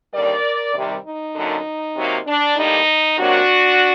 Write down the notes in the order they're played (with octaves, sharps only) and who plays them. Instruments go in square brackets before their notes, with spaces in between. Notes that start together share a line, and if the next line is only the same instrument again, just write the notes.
[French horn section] D#2 D3 G3 A#4 D5
C3 D#3 G3
D#4
F#2 D3 F#3 A#3
C3 F#3 A#3
D4
A2 G3 A#3 D#4
C3 F#3 A#3 D4 F#4